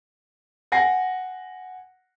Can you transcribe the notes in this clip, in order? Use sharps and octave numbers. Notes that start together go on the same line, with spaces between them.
F#5 G#5 A#6 C7